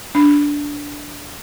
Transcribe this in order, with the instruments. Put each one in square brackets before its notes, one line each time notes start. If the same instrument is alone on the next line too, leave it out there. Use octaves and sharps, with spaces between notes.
[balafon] D4